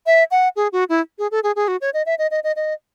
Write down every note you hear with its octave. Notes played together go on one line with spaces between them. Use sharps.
E5
F#5
G#4
F#4
E4
G#4
A4
G#4
G#4
F#4
C#5
D#5
E5
D#5
D#5
D#5
D#5